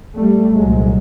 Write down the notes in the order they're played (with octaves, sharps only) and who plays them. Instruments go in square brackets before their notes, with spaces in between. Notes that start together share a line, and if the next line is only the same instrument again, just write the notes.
[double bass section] G3 A3
C2 A#2 F#3 G#3